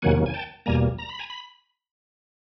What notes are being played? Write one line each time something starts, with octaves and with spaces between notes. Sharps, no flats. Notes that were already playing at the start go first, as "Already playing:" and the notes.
E2 C3 D#3 F#3 A#3 F#5 G#5
G#5
G5 A5
E2 B2 G3 A#3 G#5 A#5
A#5
B5
G#5 A#5
B5